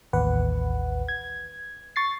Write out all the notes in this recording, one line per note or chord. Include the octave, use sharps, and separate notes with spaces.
A1 D#2 B4 F#5
G#6
C#6 A6 C7